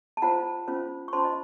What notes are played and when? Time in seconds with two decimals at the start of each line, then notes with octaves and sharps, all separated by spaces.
0.17 A5
0.22 F4 C5 F#5 A#5
0.68 C#4 F4 C5
1.08 C#6
1.13 C#4 F4 C5 A5 C6
1.24 D#5